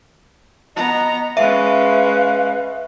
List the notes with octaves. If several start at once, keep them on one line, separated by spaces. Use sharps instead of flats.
B3 D#5 A#5
G#3 C#4 B4 E5 F5